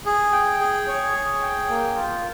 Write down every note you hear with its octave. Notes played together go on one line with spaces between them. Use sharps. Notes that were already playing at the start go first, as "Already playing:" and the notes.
G#4
G5
G#4
C#5
G#4
G5
A#3
F4